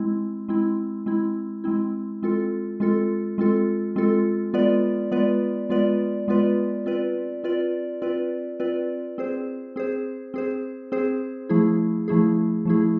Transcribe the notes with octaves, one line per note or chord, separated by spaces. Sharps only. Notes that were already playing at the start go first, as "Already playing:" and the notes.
Already playing: G#3 C4 E4
G#3 C4 E4
G#3 C4 E4
G#3 C4 E4
G#3 C4 F4 A4
G#3 C4 F4 A4
G#3 C4 F4 A4
G#3 C4 F4 A4
G#3 B3 F4 B4 D5
G#3 B3 F4 B4 D5
G#3 B3 F4 B4 D5
G#3 B3 F4 B4 D5
C4 F4 B4 D5
C4 F4 B4 D5
C4 F4 B4 D5
C4 F4 B4 D5
C4 G#4 C5
C4 G#4 C5
C4 G#4 C5
C4 G#4 C5
F3 A3 E4 G#4
F3 A3 E4 G#4
F3 A3 E4 G#4